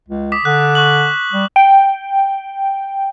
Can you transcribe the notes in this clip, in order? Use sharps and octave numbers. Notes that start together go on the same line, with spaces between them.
C#2
D6 D#6 B6
D3 F#6
C#6 F#6 F#7
G3
G5